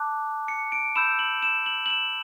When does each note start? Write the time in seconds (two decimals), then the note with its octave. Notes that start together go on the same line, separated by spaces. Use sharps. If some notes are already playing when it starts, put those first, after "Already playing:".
Already playing: A5 D6 F#6
0.48 C#7
0.72 D7
0.96 B5 E6 G6 E7
1.19 F#7
1.42 E7
1.66 F#7
1.86 F#7
1.90 E7